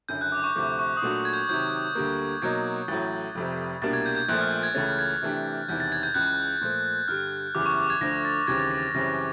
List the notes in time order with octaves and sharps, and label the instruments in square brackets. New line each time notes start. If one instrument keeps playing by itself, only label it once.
[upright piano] F#1 F#2 D3 [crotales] G6
[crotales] F#6
D6
C#6
[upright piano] D2 C3 F3 A3 [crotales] D6
[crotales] C#6
D#6
[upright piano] A#2 F#3 A3 D4 F#4 [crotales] D6
[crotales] G#6
G6
[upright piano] C3 D#3 F#3 [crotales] G6
[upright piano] D2 D3 G3 A#3
[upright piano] B2 F#3 A#3 D#4 [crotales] G#6
[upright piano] A1 A2 F#3 [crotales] A6
[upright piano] F1 F2 C3
[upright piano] C2 B2 G3 A#3 D4 [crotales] A6
[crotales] G#6
G6
G6
[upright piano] A#1 A#2 F3 A3 [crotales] F#6
[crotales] F6
G6
G#6
[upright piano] C#2 C#3 E3 A3 C#4 [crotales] A6
[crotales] G#6
[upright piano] C3 E3 A3 D4 G4
[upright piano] E1 E2 C3 D#3 [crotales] G6
[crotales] A6
G#6
G6
[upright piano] C#2 C#3 E3 [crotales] F#6
[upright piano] A#2 F3 A3
[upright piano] G2 D3 G3 [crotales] F6
[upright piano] F#1 E2 C#3 E3 G3 [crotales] D6
[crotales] C#6
D6
G#6
[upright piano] D2 D3 F3 A3 D4 [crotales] A#6
[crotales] A6
[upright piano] D#2 C#3 E3 G3 C4 [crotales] G#6
[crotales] A6
A#6
A6
A#6
[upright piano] F#2 C#3 E3 G3 C4 [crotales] A#6